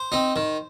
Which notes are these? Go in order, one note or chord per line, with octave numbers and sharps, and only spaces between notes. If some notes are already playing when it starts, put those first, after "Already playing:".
Already playing: C5
C4 D#4
D#3